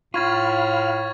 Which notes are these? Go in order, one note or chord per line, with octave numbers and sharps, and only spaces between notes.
A2 F4 F5 B5 C#6 F6 G#6 A6